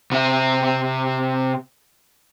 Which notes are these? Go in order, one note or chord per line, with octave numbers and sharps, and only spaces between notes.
C3 E5